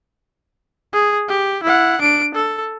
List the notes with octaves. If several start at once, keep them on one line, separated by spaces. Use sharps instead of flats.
G#4
G4
E4 F#5
D4 D7
A4